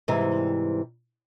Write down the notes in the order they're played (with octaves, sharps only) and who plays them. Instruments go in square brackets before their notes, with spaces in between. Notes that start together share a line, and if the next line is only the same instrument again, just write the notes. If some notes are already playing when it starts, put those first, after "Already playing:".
[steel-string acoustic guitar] G#2 C3 E3 G3